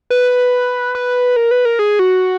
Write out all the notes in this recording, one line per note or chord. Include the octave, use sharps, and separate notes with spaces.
B4
B4
A#4
B4
A#4
G#4
F#4